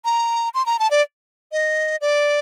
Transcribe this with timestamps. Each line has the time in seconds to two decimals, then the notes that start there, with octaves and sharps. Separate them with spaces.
0.05 A#5
0.54 C6
0.66 A#5
0.79 A5
0.91 D5
1.52 D#5
2.01 D5